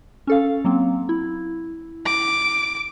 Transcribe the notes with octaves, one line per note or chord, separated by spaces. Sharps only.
C#4 A4 F5
F#3 A#3 C4
E4
D6